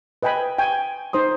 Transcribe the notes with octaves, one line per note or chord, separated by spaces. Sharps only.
B4 D#5 G5 G#5 B5
G5 G#5 C#6
D#4 C5 C6 D#6